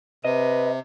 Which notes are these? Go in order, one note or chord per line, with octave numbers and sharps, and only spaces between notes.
C3 B4 D#5